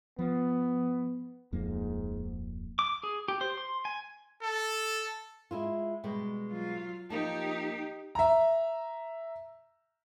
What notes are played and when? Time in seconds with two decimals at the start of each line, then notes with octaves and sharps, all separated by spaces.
0.19 F3 B3
1.52 D1 F2 G#2 A#3
2.79 D6
3.03 G#4
3.28 G4
3.41 C5
3.58 C6
3.85 G#5
4.43 A4
5.51 G#3 E4 F4
6.04 B2 G3 G#3
6.51 F#3 F4
7.10 F3 A#3 D#4 G4 A5
8.15 E5 A#5